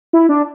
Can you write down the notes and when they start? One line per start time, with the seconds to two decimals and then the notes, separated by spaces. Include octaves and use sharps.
0.13 E4
0.29 D4